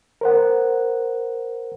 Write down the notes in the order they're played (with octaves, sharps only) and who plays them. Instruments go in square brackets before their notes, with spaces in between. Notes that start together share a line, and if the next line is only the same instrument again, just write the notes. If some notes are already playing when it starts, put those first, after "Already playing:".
[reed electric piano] A#4 C5 F#5